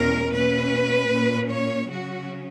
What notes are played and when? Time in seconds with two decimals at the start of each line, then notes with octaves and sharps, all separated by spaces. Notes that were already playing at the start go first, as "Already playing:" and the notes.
Already playing: E2 B2 G#3 C#4 A#4
0.32 B2 A#3 C#4 B4
1.11 A#2 A#3 C#4
1.51 C#5
1.90 C#3 F#3 C#4 F#4